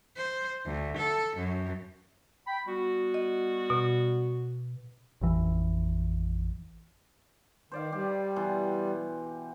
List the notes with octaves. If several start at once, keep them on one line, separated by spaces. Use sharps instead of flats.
C5
D2
A4
F#2
G5 B5
G3 B3 F#4
D#5
B2
A1 F2 E3
D#3 C5 D5 F5
G3 G4
B2 E3 C6